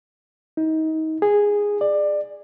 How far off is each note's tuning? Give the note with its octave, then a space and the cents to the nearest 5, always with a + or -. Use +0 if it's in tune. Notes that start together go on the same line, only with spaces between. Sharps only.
D#4 +30
G#4 -10
D5 +20